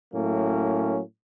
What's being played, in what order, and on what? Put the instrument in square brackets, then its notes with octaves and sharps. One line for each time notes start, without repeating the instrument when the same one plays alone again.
[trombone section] A2 F#3 A#3 C#4